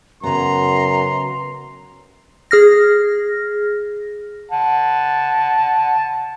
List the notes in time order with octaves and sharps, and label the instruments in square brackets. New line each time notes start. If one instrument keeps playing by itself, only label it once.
[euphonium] F#2 [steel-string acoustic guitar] C#3 B3 [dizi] A#5 [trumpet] C6
[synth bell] G#4 F6 A#6
[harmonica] F#5 A5